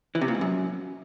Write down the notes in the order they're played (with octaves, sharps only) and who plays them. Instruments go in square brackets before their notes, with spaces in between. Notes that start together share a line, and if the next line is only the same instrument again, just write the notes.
[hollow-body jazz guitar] E3
C3
A#2
G#2
F#2